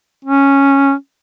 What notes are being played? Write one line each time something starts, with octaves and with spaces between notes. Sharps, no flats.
C#4